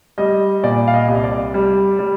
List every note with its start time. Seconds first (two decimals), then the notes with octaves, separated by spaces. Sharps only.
0.18 G3 D#5
0.64 A#2 D5
0.88 F5
0.94 D#5
1.08 C2
1.24 D5
1.54 G3
1.99 G3